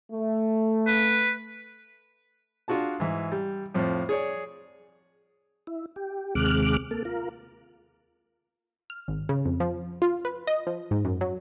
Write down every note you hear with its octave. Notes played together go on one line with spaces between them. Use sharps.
A3
B4
D4 F4 F#4 G#4 A5
G#2 E3
G3
F2 A2 F3
G#4 C#5 D5
E4
G4
D#2 C3 G#3 D6 F6 F#6
A#3 A4
F4 A#4
F6
G#1
C#3
F2
F3
F4
B4
D#5
F3
G#2
F#2
F#3